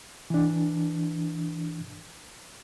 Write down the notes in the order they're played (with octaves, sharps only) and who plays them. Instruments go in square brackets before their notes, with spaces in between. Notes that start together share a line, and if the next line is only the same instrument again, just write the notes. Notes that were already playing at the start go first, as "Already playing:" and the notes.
[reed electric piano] E3 D4